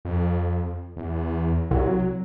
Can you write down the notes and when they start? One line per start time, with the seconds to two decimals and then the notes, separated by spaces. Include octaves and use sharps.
0.05 F2
0.97 E2
1.71 C2 F#3